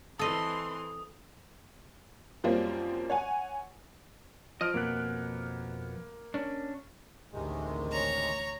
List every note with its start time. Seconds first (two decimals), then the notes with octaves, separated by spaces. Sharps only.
0.19 E3 C4 A4 D#5 C6 D#6
2.44 F#2 F3 G3 A#3 C4 C#4
3.10 C#5 F#5 G#5
4.61 F3 D#5 F6 D7
4.74 F2 B2 A#3 B3 F#6
6.34 C#4 D4
7.32 A1 D2 C3 D#3 G#3
7.91 C#5 A#5